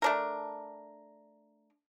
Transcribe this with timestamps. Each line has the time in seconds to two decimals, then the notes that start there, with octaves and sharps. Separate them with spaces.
0.02 A3 D4 A#4